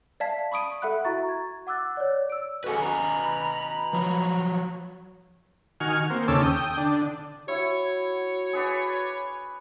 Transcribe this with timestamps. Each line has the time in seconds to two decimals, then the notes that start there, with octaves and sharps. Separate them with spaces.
0.20 D5 E5 F5 A5 G#6 B6
0.52 B5 C#6 D#6 D7 D#7
0.82 A4 E5 F#5 B5 F#6
1.05 E4 F#4 E5 A#5 C#6 A6
1.29 G#6
1.67 F#5 D6 E6 F#6 A6
1.97 C#5 D5
2.30 E6 D7
2.64 F#4 G#4 A4 B4 D#5 G#5
2.77 A#5 B5
3.93 F3 F#3
5.80 D#3 F#4 G#5 C#6 F6
6.10 A#3 C4
6.28 D#2 C#3 C#4 A4 D6 E6
6.43 G5 D#6
6.77 D3 D4
7.48 E4 F#4 C#5
8.53 G#4 B4 D5